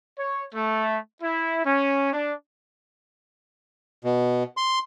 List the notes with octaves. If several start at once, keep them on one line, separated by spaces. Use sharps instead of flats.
C#5
A3
E4
C#4
D4
B2
C6